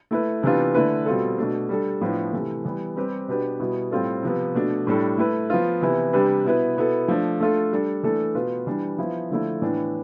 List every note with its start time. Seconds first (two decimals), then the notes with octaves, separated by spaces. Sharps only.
0.11 A3 E4 B4
0.43 C3 E3 B3 D4 F4
0.75 D3 A3 E4 B4
1.06 B2 G3 C4 F4 A4
1.38 B2 A3 D4
1.69 G3 D4 A4
2.01 A2 F3 B3 D4
2.33 C3 E3 A3
2.65 E3 G3 B3
2.96 G3 C4 G4 B4
3.28 B2 B3 D4 G4 B4
3.60 B2 G3 B3 E4
3.91 A2 G3 C4 F4 A4
4.23 C3 F3 B3
4.55 B2 A3 D4
4.87 A2 G3 D4 A4
5.18 A3 E4 B4
5.50 F3 B3 F4
5.81 C3 E3 B3 E4
6.13 C3 G3 D4 G4 B4
6.44 B2 B3 E4 B4
6.77 B2 B3 E4 A4
7.08 F3 A3 D4
7.40 A3 D4 F4 A4
7.71 G3 D4 A4
8.03 E3 A3 D4 A4
8.35 B2 B3 F4 B4
8.67 E3 G3 D4
8.98 F3 B3 E4
9.30 D3 F3 A3 E4
9.62 A2 E3 B3 D4